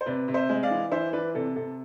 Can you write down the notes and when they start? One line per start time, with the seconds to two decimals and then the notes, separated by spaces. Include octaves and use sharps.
0.01 C5
0.06 C3 B4 D5
0.28 C3
0.34 C5 E5
0.49 G#3
0.63 D5 F5
0.70 E3
0.91 E3 C5 E5
1.13 E3 B4 D5
1.34 C3 A4
1.56 C3 A4